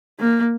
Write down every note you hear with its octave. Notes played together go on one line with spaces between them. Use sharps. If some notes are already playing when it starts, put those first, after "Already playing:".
A#3